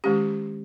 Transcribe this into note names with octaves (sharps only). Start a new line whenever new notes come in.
D#3 G#3 C#4 G4